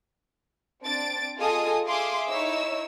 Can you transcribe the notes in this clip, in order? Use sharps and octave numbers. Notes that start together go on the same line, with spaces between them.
C4 D4 A6 D7
F4 G#4 A4 D#5 G#5 D#6
G#4 E5 F5 C6 D6 D#6
D#4 E4 C#5 E6